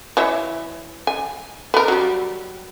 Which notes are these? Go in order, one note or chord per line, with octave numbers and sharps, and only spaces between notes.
E3 C#5 E5
G#5
B3 A#4
F#3 G3